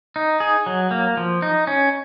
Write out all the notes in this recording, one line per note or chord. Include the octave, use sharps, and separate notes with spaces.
D#4
G#4
F#3
A#3
F3
D#4
C#4